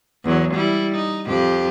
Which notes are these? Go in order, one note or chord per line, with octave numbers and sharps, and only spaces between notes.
E2 F#3
G3 E4
D#4
F2 G4